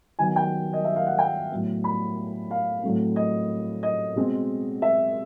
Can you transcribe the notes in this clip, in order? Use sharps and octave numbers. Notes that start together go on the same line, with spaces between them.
D#3 F#3 B3 G#5
G5
D#5
E5
F5
F#5
G5
A2 F#3 B3
B5
F5
A2 F#3 A3 C4
D#5
D#5
B2 G#3 C4
E5